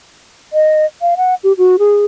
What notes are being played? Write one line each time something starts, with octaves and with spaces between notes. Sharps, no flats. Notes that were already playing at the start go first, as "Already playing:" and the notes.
D#5
F5
F#5
G4
F#4
G#4